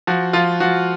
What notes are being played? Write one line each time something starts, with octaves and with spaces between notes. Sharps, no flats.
F3 F#4
F3 F4
F3 F#4